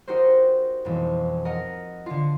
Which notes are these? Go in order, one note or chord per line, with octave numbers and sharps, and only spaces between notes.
D#4 F#4 G4 A#4 C5
E1 F2
A#4 D#5 F#5
D3 F4